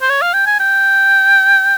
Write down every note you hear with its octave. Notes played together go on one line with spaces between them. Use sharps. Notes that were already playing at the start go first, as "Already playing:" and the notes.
C5
C#5
F5
G5
G#5
G5